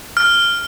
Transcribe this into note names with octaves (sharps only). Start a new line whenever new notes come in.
F6